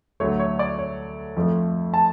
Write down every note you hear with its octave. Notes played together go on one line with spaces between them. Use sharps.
D2 D3 F#3 A3 C#5
C#5
D5
C#5
F2 F3 A3
A5